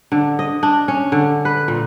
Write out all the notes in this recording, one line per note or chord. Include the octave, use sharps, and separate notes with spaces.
D3
D#5
D4
C#4
D3
B4
A#2